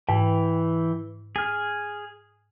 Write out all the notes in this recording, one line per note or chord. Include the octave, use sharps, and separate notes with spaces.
G#2 E3 G5
G#4 F6